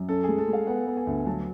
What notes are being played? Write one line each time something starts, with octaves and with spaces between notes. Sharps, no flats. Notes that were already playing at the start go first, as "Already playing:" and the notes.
Already playing: F#2
C#4 A4
G#3 G#4
A4
G#3
F5
B3 F#5
B3
G#5
D2
F#3 A5